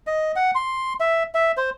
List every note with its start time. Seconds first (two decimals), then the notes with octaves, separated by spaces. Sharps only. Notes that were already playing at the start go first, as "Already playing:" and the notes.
0.07 D#5
0.36 F#5
0.55 C6
1.00 E5
1.35 E5
1.57 C5